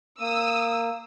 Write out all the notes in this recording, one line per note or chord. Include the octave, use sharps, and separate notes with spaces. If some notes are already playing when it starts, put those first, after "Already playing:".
A#3 D#6 E6